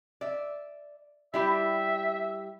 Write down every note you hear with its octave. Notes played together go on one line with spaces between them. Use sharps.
D5 E5
G3 E4 G4 E5